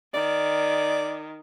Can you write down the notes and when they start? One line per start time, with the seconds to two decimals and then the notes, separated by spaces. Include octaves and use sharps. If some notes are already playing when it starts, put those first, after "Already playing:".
0.14 D#3 D5